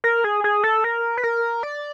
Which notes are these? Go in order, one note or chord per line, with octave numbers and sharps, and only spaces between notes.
A#4
G#4
G#4
A4
A#4
B4
A#4
D5